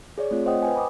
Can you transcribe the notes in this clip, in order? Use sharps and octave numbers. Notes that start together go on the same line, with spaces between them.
G#4 C#5 D5
A3 C4 F4 C#5
C5 D#5 F#5 G5 D#6
B4 G5 G#5
B5 D6 D#6